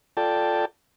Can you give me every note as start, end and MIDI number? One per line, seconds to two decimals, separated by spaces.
0.17 0.65 65
0.17 0.65 69
0.17 0.65 74
0.17 0.65 79
0.17 0.65 81